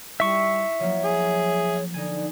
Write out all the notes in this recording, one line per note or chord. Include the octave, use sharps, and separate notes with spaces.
G3 E4 E5 C#6
F3 F#3 A#3 C#5
G#4
D3 D#4 G#5